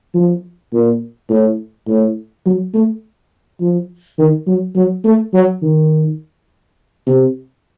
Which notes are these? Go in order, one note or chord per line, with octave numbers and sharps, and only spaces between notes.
F3
A#2
A2
A2
F#3
A3
F3
D#3
F#3
F#3
A3
F#3
D#3
C3